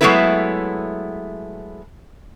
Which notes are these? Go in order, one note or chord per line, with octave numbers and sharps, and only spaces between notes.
F#3 G#3 A3 B3 E4 B4